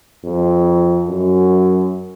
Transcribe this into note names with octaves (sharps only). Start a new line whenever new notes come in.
F2
F#2